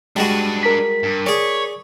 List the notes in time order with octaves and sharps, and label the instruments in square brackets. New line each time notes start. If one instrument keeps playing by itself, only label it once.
[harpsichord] G3 G#3 F#4 [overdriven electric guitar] D4 B4
[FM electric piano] A#4 B6
[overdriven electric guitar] G2
[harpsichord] G#4 D5 [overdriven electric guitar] C#5